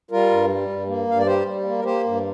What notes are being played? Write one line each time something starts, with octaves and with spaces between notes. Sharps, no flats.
G3 F4 A#4
G2
G3
G2
A#3
G2 F5
D5
G3 G4 C5
G3
A#3
A#4
A#3 G4 C5
G2